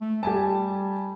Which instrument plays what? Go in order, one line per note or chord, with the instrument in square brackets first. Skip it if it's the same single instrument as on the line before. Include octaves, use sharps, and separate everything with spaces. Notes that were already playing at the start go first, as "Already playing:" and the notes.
[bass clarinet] A3
[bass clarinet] G3 [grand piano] G4 G#5 A5